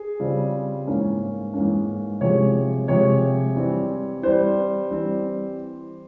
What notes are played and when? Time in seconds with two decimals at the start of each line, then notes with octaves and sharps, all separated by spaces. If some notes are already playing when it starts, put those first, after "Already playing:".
Already playing: G#4
0.20 C#3 G3 C4 F4
0.87 G#2 E3 A#3 C#4
1.54 G#2 E3 A#3 C#4
2.21 C3 F3 G#3 C#5
2.88 C3 F3 G#3 C#5
3.56 E3 G3 C4
4.23 E3 G3 C4 C5
4.91 E3 G3 C4